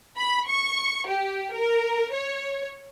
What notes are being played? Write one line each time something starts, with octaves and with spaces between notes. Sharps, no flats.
B5
C#6
G4
A#4
C#5